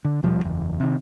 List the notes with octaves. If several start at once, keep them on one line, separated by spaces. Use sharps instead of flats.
D3
D#1 B2 F3 G3
F#1 E2
C3 D#3